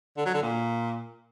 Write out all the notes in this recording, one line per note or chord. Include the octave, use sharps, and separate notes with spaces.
D3
F#3
D3
A#2